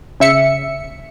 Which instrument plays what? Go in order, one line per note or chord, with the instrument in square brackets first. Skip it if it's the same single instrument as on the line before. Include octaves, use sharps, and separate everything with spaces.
[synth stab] C#3 E5 C#7